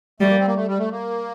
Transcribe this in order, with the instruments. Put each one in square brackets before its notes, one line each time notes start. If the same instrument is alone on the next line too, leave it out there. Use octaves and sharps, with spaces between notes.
[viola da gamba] G3 [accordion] A3
[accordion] A#3
C4
A#3
A3
G3
A3
A#3